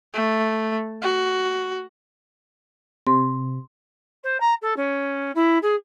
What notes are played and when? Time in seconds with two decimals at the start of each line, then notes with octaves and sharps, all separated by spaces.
0.14 A3
1.02 F#4
3.07 C3 C6
4.23 C5
4.40 A#5
4.62 A4
4.76 C#4
5.35 E4
5.62 G#4